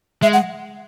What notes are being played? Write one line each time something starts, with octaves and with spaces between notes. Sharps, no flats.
G#3 E5
F#5